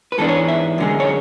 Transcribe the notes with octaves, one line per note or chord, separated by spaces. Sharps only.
B4
G#2 E3 B3 D4 A4
C#5
E5
F#2 D3 G#3
C#5